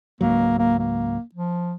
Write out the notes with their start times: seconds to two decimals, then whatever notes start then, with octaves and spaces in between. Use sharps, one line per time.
0.21 C#2 G#2 F#3 A#3
0.59 A#3
0.79 A#3
1.35 F3